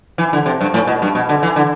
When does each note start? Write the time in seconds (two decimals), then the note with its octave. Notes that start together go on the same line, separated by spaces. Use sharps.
0.18 E3
0.33 D3
0.46 C3
0.61 G2
0.74 A2
0.87 B2
1.02 G2
1.15 B2
1.29 D3
1.43 E3
1.56 D3